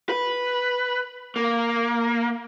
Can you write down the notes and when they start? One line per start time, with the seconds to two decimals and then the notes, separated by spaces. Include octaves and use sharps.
0.09 B4
1.36 A#3